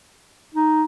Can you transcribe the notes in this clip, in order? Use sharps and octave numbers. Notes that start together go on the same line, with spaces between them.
D#4